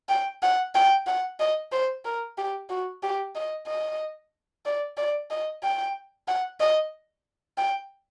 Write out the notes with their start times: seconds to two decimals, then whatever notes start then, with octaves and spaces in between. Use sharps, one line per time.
0.09 G5
0.42 F#5
0.75 G5
1.07 F#5
1.40 D#5
1.72 C5
2.05 A#4
2.38 G4
2.70 F#4
3.03 G4
3.35 D#5
3.67 D#5
4.66 D5
4.97 D5
5.31 D#5
5.63 G5
6.28 F#5
6.60 D#5
7.58 G5